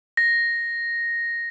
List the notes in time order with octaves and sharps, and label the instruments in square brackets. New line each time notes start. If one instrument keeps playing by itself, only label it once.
[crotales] A#6